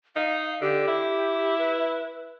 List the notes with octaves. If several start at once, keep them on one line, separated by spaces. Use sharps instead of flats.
D#4 F5
D3 G4
E4
B4